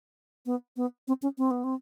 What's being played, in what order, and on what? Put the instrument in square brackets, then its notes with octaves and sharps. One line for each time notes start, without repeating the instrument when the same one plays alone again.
[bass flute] B3
B3
C4
C#4
C4
B3
C4